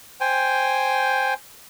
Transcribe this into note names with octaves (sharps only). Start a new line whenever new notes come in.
C5 G5 G#5